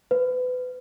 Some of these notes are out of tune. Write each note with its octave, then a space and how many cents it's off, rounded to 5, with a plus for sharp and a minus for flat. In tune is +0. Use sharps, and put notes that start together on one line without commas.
B4 +30